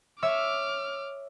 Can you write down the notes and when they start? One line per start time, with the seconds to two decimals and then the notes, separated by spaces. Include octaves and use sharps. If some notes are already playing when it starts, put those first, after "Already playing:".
0.22 C#5 E5 D6 E6 F6